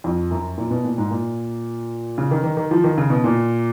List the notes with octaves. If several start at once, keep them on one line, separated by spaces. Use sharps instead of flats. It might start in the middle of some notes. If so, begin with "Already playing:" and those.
F2
F#2
A#2
B2
A#2
G#2
A#2
C#3
D#3
D#3
D#3
F3
D#3
C#3
B2
A#2